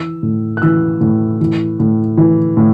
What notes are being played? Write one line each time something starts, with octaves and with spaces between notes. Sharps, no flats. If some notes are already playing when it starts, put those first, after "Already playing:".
Already playing: E3 E6
A2
F#6
E3 E6
A2
E3
A2
E3
A2